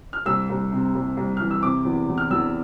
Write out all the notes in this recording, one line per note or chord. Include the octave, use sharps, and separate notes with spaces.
F6
C2 E6
C2
C3
C2
C2
E3 F6
E6
C3 D6
E2
E2
F6
E2 E6